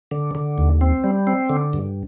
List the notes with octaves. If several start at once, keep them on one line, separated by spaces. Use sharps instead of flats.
D3
D3
D#2
C4
G3
C4
D3
G2